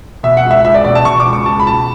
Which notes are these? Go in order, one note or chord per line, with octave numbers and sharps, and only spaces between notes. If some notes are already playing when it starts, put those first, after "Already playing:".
B2 E5
F#5
C#2
E5
C#2 E5
D5
B2 D5
A5
B2 C#6
D6
C#2
C#6
C#2 A5
B5
B2 A5